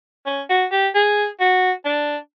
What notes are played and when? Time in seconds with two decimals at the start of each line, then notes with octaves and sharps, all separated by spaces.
0.26 C#4
0.49 F#4
0.71 G4
0.95 G#4
1.40 F#4
1.85 D4